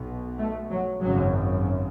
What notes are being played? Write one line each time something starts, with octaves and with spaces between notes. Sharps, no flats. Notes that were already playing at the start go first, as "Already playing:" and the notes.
Already playing: B1 B2
A3
F#3
G#1 F#2 C#3 F#3